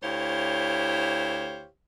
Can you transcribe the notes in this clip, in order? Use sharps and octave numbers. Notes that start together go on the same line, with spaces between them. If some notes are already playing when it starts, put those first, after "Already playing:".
D2 E4 G4 C5 C#5 F5